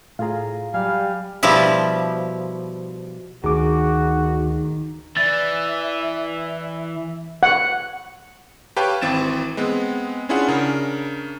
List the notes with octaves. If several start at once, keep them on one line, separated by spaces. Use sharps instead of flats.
A2 F4 G#4 F5 A#5
F#3 G3 F5 G#5
B2 F3 G3 E4
D2 D#3 F#4 G#4 D6
E3 D5 E5 A6
F#5
G4 B4 C#5 F5 G5 A5
G#1 E3 C4 A6 E7
G#3 B3 C4
C#4 D4 E4 F4 G#4 F#5
C#3 D4 A#4